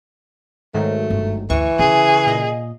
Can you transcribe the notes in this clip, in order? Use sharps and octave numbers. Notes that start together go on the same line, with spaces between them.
G#2 D#3 F#3 A3
G1
D2 E3 C#6
C#3 G#4
A#2 D#5